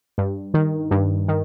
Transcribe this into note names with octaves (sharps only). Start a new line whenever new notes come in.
G2
D#3
G2
D#3